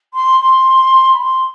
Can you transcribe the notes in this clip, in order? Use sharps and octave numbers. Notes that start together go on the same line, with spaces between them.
C6
C6
B5
C6